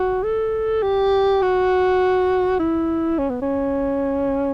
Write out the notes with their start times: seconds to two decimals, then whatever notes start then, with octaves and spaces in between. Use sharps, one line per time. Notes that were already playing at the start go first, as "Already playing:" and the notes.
Already playing: F#4
0.23 A4
0.82 G4
1.42 F#4
2.60 E4
3.18 C#4
3.30 B3
3.42 C#4